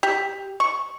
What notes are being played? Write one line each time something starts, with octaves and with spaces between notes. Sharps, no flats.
G4
C#6